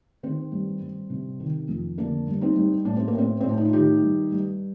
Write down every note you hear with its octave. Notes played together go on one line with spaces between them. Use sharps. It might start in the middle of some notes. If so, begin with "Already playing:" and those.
D#3 C4
G2
G2
C3
D#3
F2
D3 A#3 D4
G2
C4 D#4
G2
A2 D4
C4
A#3
A2 C4
A2 C4
D4
D#4
F4
D#3 D#4 G4
G2
G2